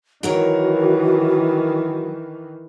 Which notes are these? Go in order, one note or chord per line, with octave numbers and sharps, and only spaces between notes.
D#3 E3 F#3 F#4 A#4 C#5